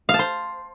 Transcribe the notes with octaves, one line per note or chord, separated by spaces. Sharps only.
F5
A5
C5